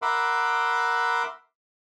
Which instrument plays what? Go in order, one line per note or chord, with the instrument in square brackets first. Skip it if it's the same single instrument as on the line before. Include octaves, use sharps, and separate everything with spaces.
[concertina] A#4 E5 F#5 B5 C6 D6